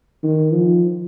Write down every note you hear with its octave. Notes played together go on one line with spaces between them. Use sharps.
D#3
F3